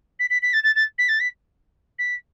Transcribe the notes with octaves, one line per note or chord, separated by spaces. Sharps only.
B6
B6
B6
A6
A6
A6
B6
A6
B6
B6